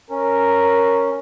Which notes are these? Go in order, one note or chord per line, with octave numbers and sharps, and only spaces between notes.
C#4 A#4